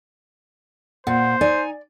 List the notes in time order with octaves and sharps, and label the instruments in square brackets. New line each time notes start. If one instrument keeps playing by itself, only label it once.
[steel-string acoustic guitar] A#2 [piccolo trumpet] C5 [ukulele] F#5
[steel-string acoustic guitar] D#4 G#5 [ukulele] D5